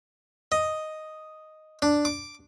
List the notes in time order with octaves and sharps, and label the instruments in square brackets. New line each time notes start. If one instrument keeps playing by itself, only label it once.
[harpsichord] D#5
D4
D6